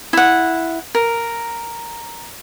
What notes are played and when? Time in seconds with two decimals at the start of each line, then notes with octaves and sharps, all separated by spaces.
0.13 E4 F#5
0.95 A#4